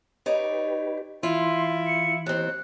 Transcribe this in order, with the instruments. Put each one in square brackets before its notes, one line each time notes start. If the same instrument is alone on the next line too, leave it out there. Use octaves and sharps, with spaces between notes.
[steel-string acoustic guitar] D#4 C#5 D5 [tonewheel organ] G4 B4
[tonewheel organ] E3 [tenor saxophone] E4 [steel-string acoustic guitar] F4 [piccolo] C6
[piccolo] C#7
[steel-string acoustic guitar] D#2 C4 [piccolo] F#6